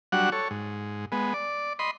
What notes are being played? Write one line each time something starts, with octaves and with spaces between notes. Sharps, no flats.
F#3 G3 D4 F#4 F#5
A4 C#5
G#2
G#3 B3
D5
D#5 B5 C6